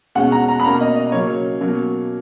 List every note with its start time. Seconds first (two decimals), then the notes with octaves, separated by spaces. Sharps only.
0.15 B2 G#3 C#4 F#5
0.32 A#5
0.48 A#5
0.60 B5
0.64 B2 A#3 C#4 A#5
0.81 D#5
0.96 D#5
1.12 C#3 F#3 A#3 C#4 C#5
1.61 B2 F#3 A#3 C#4